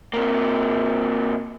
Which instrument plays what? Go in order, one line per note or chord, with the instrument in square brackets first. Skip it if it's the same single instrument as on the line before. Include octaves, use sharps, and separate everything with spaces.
[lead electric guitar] C3 A#3